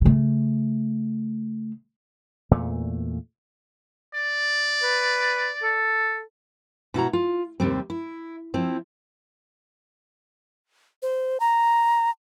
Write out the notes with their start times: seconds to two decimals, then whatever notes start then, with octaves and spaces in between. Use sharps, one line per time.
0.01 C#3 A3
2.51 E2 A#2 A3
4.14 D5
4.83 B4
5.63 A4
6.94 B2 E4 F#4 A#5
7.13 F4
7.60 D#2 C3 G3 C4
7.90 E4
8.54 F3 C4 E4
11.02 C5
11.40 A#5